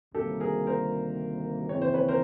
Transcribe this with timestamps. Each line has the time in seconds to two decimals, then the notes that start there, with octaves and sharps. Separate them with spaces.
0.14 D2 C3 D#3 G3 A#3 G4 A4
0.40 G#4 A#4
0.67 A#4 C5
1.69 D#2 C#3 E3 G#3 C4 C#5
1.82 C5
1.94 B4 C#5
2.08 A#4 C5